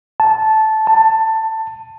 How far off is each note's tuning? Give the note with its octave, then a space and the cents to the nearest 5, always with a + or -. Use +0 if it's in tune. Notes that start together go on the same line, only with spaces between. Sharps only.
A5 -10
A5 +15